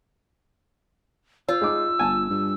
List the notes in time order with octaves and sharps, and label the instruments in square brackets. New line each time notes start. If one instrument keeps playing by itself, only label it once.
[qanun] F4 [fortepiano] C5 [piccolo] E6
[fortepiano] G#3 D#4 D6
[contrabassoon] G1 [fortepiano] G#5 A5
[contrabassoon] G2